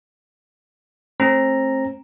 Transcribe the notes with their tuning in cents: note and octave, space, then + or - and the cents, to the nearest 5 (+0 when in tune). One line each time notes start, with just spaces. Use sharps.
A3 +0 C4 +30 A#5 +0